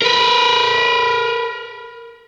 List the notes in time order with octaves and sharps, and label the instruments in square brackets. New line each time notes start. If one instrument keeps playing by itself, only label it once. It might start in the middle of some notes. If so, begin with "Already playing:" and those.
[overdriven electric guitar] A#4 B4